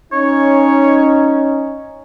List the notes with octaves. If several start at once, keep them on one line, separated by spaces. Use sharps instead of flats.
C#4 D#4 C#5